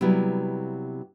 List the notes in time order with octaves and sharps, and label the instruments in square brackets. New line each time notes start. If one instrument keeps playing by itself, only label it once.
[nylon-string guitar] C3 F#3 G3 B3 E4